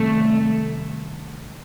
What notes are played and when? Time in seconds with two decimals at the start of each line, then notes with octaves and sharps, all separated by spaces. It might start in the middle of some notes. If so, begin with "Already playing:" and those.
Already playing: C3 D#3 G3 A3 C4